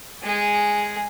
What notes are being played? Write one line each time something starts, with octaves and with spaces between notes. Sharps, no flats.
G#3 G#4